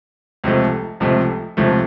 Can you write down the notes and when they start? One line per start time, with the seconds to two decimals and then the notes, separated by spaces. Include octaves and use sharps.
0.44 C#2 C3 F3 A3
1.00 C#2 C3 F3 A3
1.57 C#2 C3 F3 A3